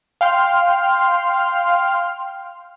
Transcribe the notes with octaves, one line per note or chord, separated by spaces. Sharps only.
F5 G5 C6 F6